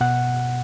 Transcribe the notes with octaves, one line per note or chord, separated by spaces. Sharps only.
B2 F#5